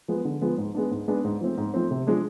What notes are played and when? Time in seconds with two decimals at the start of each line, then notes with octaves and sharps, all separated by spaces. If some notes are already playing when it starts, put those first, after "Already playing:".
0.08 F3 G#3 B3
0.25 D3
0.41 F3 G#3 B3
0.58 G#2
0.75 G#3 B3 D4
0.91 G#2
1.08 G#3 B3 D4
1.24 G#2
1.41 F3 A3 C4
1.57 G#2
1.74 F3 A3 C4
1.91 C3
2.07 F3 G#3 D4